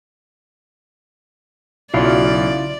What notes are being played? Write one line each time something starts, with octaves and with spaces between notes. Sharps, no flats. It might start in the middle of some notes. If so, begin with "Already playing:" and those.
B1 C#3 F#3 E4 F4 D5 E5